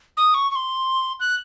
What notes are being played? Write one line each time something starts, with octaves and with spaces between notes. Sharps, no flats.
D#6
C#6
C#6
C6
F#6